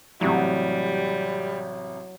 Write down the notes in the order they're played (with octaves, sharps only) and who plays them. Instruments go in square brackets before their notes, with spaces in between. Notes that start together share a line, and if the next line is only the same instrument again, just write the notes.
[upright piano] A1 C3 [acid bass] F#3 [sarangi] G3